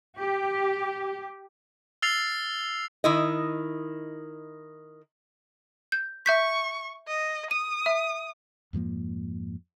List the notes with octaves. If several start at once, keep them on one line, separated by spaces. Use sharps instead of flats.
G4
E6 F6 A6 C7 F7
D#3 E4 D#5
G6
E5 C#6 G6 B6
D#5
D#6 D#7
E5
F2 G#2 F3 A#3